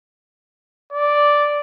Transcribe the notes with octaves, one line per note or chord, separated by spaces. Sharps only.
D5